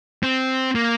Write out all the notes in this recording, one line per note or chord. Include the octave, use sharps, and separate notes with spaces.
C4
A#3